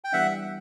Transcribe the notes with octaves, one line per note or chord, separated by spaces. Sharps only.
G5
E3 G3 B3 D4 E5 F#5